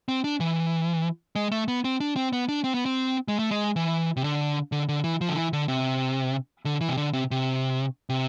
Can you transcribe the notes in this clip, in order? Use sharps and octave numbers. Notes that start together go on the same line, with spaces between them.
C4
D4
E3
G#3
A3
B3
C4
D4
C4
B3
D4
C4
B3
C4
G#3
A3
G#3
E3
C3
D3
D3
D3
E3
F3
D3
E3
D3
C3
D3
E3
C3
D3
C3
C3
C3